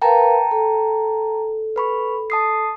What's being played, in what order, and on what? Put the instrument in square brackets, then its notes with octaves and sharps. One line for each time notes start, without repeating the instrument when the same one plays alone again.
[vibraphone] A#4 B4 F5 [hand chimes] G5 A5 A#5
[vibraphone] A4
[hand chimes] B4 B5 C#6
A5 D#6 C7